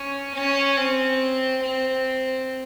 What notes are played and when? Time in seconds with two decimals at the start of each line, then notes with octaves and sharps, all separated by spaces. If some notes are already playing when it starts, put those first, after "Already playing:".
Already playing: C#4
0.35 C#4
0.77 C4
1.62 C4